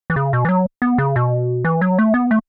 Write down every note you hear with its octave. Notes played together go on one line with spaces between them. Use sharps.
E3
C#3
B2
E3
F#3
B3
C#3
B2
E3
F#3
A3
B3
A3